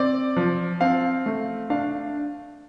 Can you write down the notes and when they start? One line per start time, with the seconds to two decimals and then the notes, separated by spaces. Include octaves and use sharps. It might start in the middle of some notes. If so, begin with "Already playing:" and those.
Already playing: C4 D5
0.37 F3
0.81 C4 F5
1.26 A3
1.70 D4 F5